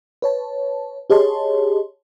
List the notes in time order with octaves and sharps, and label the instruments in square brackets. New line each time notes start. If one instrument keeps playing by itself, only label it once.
[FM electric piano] B4 C#5 A5
G4 G#4 C#5 D#5 A5 C6